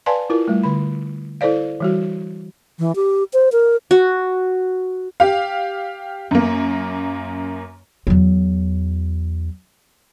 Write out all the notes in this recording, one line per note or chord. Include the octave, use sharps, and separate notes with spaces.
B4 D5 F5 G#5 A5 C6
E4 F4 A#4
G3 A3
D3 B5
E4 A4 C5 D5 F5
E3 G3 F#4
E3
G4
C5
A#4
F#4
G4 F5
F#2 A#3
E2 F#3